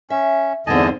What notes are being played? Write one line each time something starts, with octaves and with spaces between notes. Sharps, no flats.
C#4 E5
E2 G2 D3 D#3 C4 D#5 G#5 A5